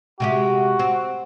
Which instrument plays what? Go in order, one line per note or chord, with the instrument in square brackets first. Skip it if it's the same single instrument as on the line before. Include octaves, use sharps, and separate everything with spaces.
[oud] C3 G#3 G4 [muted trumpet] F#4
[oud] C4